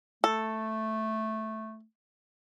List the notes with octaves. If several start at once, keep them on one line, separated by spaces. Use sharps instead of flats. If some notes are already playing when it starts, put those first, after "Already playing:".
A3 A4